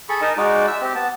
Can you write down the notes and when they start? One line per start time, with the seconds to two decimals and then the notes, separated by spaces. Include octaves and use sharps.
0.09 G#4 A4 B5 C#6
0.21 D#4 A#4 D#5 A5
0.37 G#3 D#4 F#4 D5
0.67 E5 E6
0.81 C4 G4
0.95 B3 A5